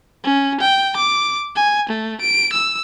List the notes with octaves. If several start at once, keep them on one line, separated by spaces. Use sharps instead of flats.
C#4
G5
D6
G#5
A3
D7
E6